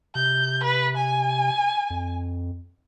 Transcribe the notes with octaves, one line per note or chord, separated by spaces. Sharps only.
C3 G6
B4
G#5
F2